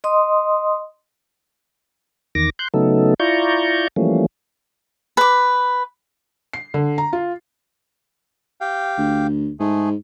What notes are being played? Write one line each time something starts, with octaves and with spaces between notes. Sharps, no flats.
D#5 C6 D#6
E2 D#3 D6 A#6
C6 F#6 G6
C#3 F#3 A3 B3 D#4 A4
E4 F4 D5 A#5 C#6 G6
E3 F3 G3 A3 A#3 C#4
B4 D6
C7
D3
A#5
F4
G4 F5 G5
D2
G#2 A3 G#4